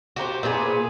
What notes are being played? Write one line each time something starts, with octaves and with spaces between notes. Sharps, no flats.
F#4 G4 A#4 C5
A#2 B3 F#4 G#4